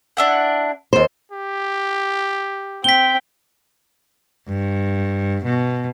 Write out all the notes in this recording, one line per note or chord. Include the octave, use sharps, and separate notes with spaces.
D4 E4 F#5
D#2 C5
G4
C4 G5 B6 G7
G2
B2